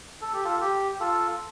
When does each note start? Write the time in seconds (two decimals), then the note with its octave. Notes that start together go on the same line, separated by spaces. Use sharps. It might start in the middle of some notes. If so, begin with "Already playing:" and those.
0.21 A4
0.33 G4
0.44 F4 A4
0.61 G4
1.00 F4 A4